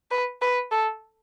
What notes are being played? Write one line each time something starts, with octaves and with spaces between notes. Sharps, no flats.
B4
B4
A4